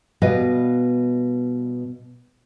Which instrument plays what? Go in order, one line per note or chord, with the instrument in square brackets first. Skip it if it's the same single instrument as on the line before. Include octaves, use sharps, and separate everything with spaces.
[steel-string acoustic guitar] B2 G3 B4 D#5 F5